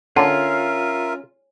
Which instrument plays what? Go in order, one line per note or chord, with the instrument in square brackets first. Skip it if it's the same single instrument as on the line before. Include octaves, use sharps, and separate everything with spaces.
[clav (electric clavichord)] D3 [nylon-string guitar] C#4 [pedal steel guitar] F4 [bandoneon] A#4 E5